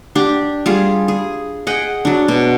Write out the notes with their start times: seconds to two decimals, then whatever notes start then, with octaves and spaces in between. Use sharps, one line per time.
0.15 D4 G4
0.66 G3 F4 G#4
1.08 G#4
1.67 G#4 D#5 F#5 G5
2.05 F#3 D4
2.28 B2